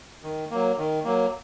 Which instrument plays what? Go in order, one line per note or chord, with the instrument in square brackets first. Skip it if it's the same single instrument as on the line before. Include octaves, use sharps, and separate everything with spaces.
[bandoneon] D#3
F#3 A#3
D#3
F#3 A#3